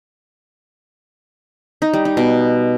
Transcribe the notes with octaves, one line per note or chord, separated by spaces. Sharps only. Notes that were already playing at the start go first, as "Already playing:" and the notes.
D#4
G3
D#4
B2